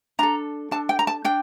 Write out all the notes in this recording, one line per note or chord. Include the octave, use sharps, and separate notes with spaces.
D4 A4 A#5
D4 A4 A5
G5
A#5
A5
D4 G5